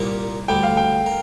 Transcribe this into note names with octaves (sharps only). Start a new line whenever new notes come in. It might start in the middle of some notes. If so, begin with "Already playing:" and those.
Already playing: C2 A#2 A#3 G4 A#4
D2 D3 G3 G5
F5
G5
A#4